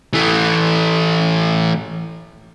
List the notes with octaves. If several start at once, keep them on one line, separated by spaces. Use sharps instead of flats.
E3 A3